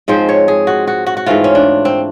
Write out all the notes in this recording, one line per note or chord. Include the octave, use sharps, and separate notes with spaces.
G#2 F3 G#3 C4 C5
C#5
G#4
F#4
F#4
F#4
F#4
G#2 E3 A3 C4 F4
C#4
D4
C4